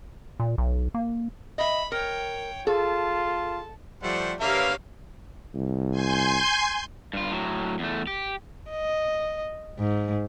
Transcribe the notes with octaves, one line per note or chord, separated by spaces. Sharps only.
A#2
B1
A#3
D#5 E5 B5
A#4 C#5 G5
F4 G#4 A4 A5
F3 G3 A3 C5 F#5
D3 A#3 G4 A#4 B4 C#5 E5 F5
C2
G#5 C6 G6
G2 F4
A2 F#3
E2 A3
G4
D#5
G#2